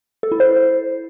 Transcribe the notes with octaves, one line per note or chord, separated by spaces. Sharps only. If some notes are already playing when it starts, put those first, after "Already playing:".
A4
E4
C5